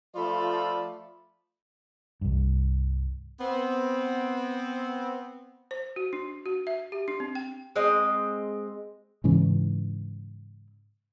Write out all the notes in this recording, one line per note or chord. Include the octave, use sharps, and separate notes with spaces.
F3 A3 F4 A4 D5 B5
C2 G2
B3 C4
C5
F#4
D4
F#4
E5
G4
D4
C4
G5
G#3 C4 D#5
G#2 C#3 E3